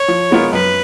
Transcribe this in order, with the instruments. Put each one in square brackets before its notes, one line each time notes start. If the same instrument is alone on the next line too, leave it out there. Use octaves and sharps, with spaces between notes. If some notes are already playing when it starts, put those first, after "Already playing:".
Already playing: [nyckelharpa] C#5
[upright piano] F3
G#3 B3 F4 A#4
[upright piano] F#2 [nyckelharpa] B4